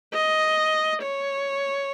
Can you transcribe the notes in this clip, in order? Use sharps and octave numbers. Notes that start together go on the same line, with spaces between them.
D#5
C#5